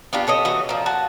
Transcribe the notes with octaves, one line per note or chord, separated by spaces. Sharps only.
B3 D4 F4 G4
G4 A4 C#5 D#5
E3 F#4 D#5
A#2 F3
F#4 A5